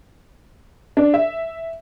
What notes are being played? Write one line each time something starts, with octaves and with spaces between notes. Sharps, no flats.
D4
E5